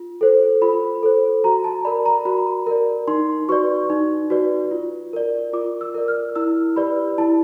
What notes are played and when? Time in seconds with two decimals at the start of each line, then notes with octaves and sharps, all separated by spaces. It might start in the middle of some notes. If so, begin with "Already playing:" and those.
Already playing: F4
0.21 A4 C5
0.61 F4 B5
1.03 A4 C5
1.44 F#4 A#5
1.64 A5
1.85 A#4 D5 B5
2.06 A#5
2.25 F#4 B5
2.67 A#4 D5
3.08 D#4 C6
3.49 F#4 B4 D5 C#6
3.90 D#4
4.30 F#4 B4 D5
4.71 F4
5.13 A#4 D5
5.53 F4 D6
5.81 E6
5.94 A#4 D5
6.08 F6
6.35 E4 E6
6.76 G4 B4 D5 B5
7.18 E4 A5